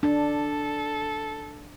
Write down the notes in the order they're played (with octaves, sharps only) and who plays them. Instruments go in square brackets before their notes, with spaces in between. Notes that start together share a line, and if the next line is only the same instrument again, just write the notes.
[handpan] D4 [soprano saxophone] A4